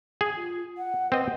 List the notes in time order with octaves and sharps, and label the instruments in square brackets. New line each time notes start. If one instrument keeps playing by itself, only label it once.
[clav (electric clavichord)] G#4
[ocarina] F4
F#5
[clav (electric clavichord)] C4 D#5 [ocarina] B4